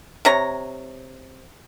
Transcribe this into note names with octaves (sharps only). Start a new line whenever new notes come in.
C3 C#5 A#5